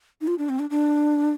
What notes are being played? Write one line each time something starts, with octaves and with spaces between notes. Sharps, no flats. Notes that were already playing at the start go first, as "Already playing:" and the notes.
D#4
F4
D4
C4
D4
D4